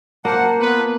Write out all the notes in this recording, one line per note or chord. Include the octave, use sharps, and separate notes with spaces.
F#2 A#3 C5 F#5 A5
B3 F4 B4